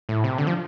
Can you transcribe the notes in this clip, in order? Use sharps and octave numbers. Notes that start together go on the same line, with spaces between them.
A2
C3
D3
F3